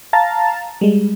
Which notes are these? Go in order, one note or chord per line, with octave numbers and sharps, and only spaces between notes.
F5 A5 A#5 A6
G3 G#3